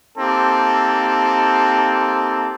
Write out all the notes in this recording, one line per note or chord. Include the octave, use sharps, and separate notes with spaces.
A#3 C4 D#4 G4 A4